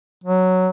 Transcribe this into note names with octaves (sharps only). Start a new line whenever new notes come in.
F#3